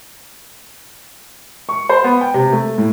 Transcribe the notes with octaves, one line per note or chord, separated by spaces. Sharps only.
C#6
C5
B3
G5
C3
A3
A2